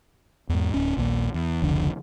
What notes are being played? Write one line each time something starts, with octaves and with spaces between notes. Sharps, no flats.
E2 G#2
D1 C#4
A#1 D#2 A#2
E2
F1 C#2 D3 F3